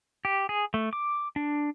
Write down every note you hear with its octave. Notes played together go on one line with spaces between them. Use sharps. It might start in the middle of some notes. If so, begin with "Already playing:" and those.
G4
G#4
A3
D6
D4